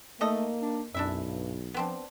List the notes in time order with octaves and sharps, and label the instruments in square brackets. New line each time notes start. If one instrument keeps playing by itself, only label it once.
[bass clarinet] A3 [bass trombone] A#3 [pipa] D#4 A4 D#5
[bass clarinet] D4
[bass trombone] B1 [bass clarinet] F#2 [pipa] D4 E4 E5
[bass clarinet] G2
[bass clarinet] F3 [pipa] B3 C4 D4